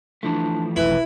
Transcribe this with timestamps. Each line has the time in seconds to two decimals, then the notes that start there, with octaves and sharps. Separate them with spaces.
0.23 E3 F3 A3 D4
0.76 F1 B1 E4 B4